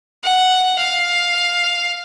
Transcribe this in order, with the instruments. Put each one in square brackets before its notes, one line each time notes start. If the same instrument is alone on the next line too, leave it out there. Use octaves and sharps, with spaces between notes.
[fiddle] F#5
F5